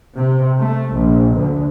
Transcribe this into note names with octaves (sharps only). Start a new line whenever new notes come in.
C3
A3
A#1
D2